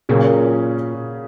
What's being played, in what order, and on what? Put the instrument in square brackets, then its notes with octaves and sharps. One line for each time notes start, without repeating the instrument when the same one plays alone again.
[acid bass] A#2 [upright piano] C#3 F#3 A#3 C#4 G#4